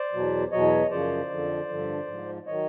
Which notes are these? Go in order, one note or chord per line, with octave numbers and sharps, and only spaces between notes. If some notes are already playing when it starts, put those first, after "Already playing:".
Already playing: C5 D5
E2 B2 F#3
E2 B2 F#3 C#5 D#5
F#2 C#3 F3 C5 D5
F2 D3 F3
G2 D3 F3
G#2 F3
D#3 F#3 C#5 D#5